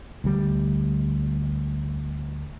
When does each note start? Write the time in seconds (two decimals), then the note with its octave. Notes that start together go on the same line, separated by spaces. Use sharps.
0.24 D2 G3